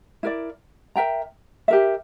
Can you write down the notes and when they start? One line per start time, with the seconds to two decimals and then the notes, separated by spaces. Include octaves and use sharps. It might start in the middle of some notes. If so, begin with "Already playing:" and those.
0.23 E4 A#4 D5
0.96 A#4 E5 G5 A#5
1.68 G4 A#4 E5